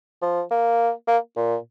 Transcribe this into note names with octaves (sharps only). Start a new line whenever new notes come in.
F3
A#3
A#3
A#2